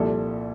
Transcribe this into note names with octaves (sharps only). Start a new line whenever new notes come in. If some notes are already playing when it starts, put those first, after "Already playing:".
Already playing: C2 A#2 F3 A4